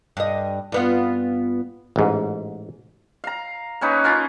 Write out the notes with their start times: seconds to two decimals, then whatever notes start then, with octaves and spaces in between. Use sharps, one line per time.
0.17 G2 D#5
0.72 G2 B3 F4
1.96 A1 G#2
3.24 F5 A#5
3.81 A#3 C#4 D#4 B4
4.04 C#4 F4 A#4